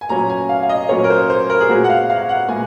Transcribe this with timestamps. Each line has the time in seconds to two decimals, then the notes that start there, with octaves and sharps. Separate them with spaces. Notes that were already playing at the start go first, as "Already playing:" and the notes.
0.01 G#5
0.09 A#2 F#3 C#4 A#5
0.30 G#5
0.49 F5
0.63 F5
0.69 D#5
0.89 A#2 F#3 C#4 C#5
1.04 A#4
1.10 C5
1.30 C5
1.50 A#4
1.60 G#4
1.69 A#2 G#3 C4 F#4
1.84 F#5
1.90 F5
2.10 F5
2.29 F#5
2.48 A#2 G#3 G#5